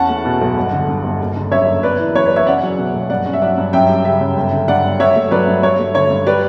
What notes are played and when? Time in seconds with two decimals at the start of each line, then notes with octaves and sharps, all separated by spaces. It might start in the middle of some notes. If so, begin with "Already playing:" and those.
Already playing: E2 C#4 F#5 A5
0.09 A3
0.25 B2
0.41 B1
0.57 G1
0.72 D3
0.88 G2
1.04 G1
1.20 F#1
1.36 D3
1.52 F#2 C#5 E5
1.67 F#1
1.83 B3 B4 D5
1.99 E3
2.15 F#2 C#5
2.26 B4 D5
2.31 F#1
2.36 C#5 E5
2.47 C#4 D5 F#5
2.63 F#3
2.78 B2
2.94 B1
3.10 G2 D5 F#5
3.26 C#4
3.33 E5
3.42 F#3 D5 F#5
3.58 G2
3.73 F#2 E5 G5
3.89 G3
4.05 C#3 E5 G5
4.21 F#2
4.37 G1
4.52 D3
4.68 G2 D5 F#5
4.84 G1
5.00 G2 C#5 E5
5.16 A3
5.31 F#3 B4 D5
5.48 G2
5.63 G2 C#5
5.79 A3
5.95 D3 C#5
6.10 G2
6.27 G3 B4 D5